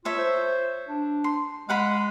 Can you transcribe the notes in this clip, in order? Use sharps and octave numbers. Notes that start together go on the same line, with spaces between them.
F4 A4 C#5 E5
C5
D4
C6
G#3 F5 F#5 B5